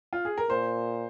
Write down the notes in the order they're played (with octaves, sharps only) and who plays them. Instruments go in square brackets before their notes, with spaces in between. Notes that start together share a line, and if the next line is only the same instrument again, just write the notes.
[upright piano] F4
G#4
A#4
[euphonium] A#2 [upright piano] C5